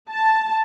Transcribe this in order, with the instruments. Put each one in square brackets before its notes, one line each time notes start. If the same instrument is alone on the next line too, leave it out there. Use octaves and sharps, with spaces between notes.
[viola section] A5